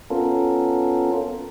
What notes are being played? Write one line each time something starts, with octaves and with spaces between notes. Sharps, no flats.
B3 C#4 F4 A4 A#4